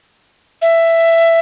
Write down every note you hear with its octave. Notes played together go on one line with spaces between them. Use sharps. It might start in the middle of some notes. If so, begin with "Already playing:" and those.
E5